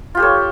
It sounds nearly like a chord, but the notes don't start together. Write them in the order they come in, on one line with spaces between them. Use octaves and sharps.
F4 G4 A4 C#5